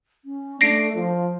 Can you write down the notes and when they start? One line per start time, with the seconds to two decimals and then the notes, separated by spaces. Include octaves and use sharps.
0.25 C#4
0.61 A3 D4 A#6 C7 D7
0.95 F3 F4